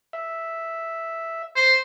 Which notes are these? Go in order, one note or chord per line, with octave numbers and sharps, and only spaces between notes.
E5
C5